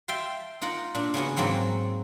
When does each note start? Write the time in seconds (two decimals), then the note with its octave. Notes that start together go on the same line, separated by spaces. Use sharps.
0.08 E5 F5 G5 A5 C6
0.61 D#4 F4 A#4 F#5
0.95 A#2 D4
1.14 C#3 B3 C#4 F#4
1.36 G#2 F#3 A#3 C4 C#5